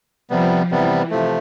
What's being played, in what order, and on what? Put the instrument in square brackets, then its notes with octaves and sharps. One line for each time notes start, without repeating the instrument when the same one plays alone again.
[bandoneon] C3 G3 B3 [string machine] F3
[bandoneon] C3 G3 B3 [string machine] E3
[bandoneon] C3 F3 A3